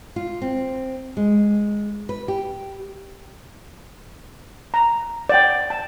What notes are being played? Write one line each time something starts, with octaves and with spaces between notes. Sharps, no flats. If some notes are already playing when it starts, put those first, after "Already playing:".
F4
C4
G#3
B4
G4
A#5
D5 F#5 G5
A5